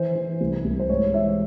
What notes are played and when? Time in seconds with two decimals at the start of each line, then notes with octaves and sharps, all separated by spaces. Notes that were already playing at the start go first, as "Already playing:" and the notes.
Already playing: E3 C5
0.15 E3
0.41 C2
0.65 C2
0.80 C5
0.89 G#2 C#5
1.14 E3 E5